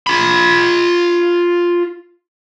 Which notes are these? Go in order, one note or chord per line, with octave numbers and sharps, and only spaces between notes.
F4 B5